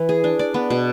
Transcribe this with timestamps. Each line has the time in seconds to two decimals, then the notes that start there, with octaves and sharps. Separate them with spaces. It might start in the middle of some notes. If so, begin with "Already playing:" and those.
Already playing: E3
0.09 G#4
0.24 D4
0.39 D5
0.54 B3
0.70 B2